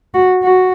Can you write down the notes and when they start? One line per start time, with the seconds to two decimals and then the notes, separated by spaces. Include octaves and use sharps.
0.14 F#4
0.43 F#4